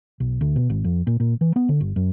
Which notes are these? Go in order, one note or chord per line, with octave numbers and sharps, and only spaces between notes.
B1
D2
B2
G#1
F2
A#2
A#2
E3
B3
D3
G1
F#2